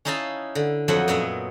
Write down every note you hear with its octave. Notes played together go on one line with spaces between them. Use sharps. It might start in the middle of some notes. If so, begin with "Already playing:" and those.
C#4 D#4 E4 D#5 F5 A5
D3
F2 F3 F#3 D#5 E5 F#5
F#2 A#2 B3 D#5 E5 A#5